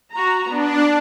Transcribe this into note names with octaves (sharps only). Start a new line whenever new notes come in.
F#4 A#5
B3 D4